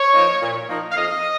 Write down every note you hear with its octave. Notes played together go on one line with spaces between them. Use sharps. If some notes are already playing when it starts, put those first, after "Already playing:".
Already playing: C#5
F3 A#3 D#4
A#2
F3 A#3 D#4
F5
F2 D#5